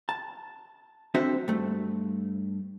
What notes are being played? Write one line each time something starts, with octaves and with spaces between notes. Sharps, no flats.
A5
C4 D4 F#4 A4 C5 E5
G2 A3